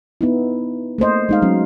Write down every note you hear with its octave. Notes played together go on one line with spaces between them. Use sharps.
B3 D#4 E4
A3 A#3 C5 D#5
G#3 D#4 F5
F#3 C#4